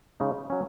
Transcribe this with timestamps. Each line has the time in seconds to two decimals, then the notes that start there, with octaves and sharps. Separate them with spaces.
0.20 C#3 G#3 D#4
0.50 F#3 C#4